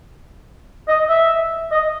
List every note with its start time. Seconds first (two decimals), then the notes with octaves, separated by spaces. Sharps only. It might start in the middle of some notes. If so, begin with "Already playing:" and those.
0.88 D#5
1.09 E5
1.72 D#5